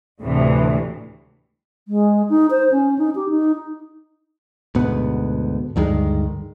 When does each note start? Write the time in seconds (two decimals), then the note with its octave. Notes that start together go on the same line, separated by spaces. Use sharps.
0.21 D2 A2 C3 E3
1.88 G#3
2.29 D#4
2.50 C5
2.71 C#4
2.98 D#4
3.15 G4
3.29 D#4
4.75 D2 G#2 B2 B3
5.76 D2 G2 D#3 G#3